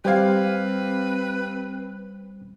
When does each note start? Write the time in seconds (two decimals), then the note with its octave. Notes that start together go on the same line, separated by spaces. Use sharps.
0.05 G3 C4 G4 B4 C5 F5 G#6